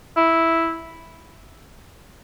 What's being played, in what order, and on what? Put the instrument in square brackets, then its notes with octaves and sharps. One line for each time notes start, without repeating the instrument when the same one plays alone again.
[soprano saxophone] E4